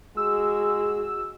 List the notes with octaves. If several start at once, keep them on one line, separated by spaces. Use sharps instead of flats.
G#3 F#4 G#4 E6